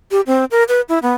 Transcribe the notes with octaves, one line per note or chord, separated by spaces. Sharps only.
G4
C4
A#4
B4
E4
B3